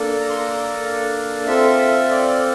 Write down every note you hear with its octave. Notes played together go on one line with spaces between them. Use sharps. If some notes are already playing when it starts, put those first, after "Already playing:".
Already playing: A#3 D4 A4
A#5
C6
A#5
F5
C4 F4 A4 E5
E5
D5